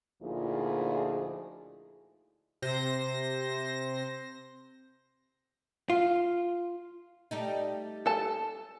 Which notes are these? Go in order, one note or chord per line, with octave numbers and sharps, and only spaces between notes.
D2 A#2 F3 D#4 E4 G#4
C3 C5 A#6
F4
G3 A3 D#4
A4 A5